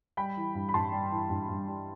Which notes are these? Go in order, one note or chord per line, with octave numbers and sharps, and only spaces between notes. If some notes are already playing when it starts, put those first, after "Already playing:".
G3 G5 B5
E3
G2
B5
G2 A5 C6
G3
E3
G2
G2
G3